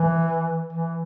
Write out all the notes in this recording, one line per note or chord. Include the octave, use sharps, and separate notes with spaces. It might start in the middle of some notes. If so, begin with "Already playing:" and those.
Already playing: E3
E3